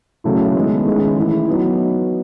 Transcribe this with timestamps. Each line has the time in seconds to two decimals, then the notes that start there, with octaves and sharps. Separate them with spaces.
0.24 C#3 F#3 A3 E4
0.56 D#3 G#3 B3 E4
0.86 D#3 G#3 C#4 E4
1.17 E3 A3 E4
1.48 F#3 B3 D#4